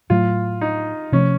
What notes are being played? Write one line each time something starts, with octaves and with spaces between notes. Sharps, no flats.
A2 F#3 A3 F4
D#4
C3 F3 A3 C#4